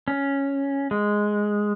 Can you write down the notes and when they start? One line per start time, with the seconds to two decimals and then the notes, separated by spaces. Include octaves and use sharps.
0.08 C#4
0.91 G#3